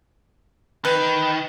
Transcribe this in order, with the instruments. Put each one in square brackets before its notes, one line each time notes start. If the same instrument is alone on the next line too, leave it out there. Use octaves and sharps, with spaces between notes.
[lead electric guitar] D#3 [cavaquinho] B4